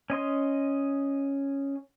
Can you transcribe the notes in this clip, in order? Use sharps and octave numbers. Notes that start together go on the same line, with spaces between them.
C#4 D#5 C6